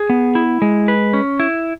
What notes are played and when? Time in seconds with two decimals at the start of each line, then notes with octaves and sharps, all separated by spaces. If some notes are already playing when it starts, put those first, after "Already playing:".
Already playing: G#4
0.10 B3
0.35 E4
0.62 G#3
0.88 B4
1.13 C#4
1.40 E4